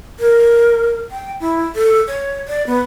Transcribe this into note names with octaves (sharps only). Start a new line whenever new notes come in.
A#4
G5
E4
A4
C#5
D5
B3